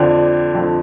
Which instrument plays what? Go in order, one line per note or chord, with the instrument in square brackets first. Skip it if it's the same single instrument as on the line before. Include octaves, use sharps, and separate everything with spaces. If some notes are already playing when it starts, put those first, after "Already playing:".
Already playing: [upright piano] F2 D3 F3 D4
F2 D3 F3